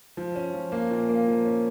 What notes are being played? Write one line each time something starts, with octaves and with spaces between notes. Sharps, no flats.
F3
C#4
F3
A#3
A#2
A#3
F3
C#4